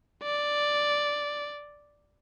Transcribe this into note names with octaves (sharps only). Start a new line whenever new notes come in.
D5